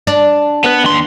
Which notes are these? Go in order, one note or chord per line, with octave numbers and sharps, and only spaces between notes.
D4
B3 B4
D#2 C6